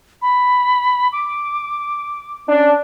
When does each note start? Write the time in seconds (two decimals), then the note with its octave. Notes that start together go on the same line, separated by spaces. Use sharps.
0.22 B5
1.12 D6
2.49 C#4 D4